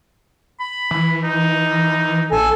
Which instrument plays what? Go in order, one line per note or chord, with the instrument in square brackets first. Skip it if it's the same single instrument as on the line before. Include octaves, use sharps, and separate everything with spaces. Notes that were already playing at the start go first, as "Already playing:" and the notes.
[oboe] B5
[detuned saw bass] E3
[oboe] D#4
[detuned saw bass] A#1 [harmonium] A4 G#5